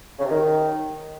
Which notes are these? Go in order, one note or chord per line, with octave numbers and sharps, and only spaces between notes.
C#3
C3
D#3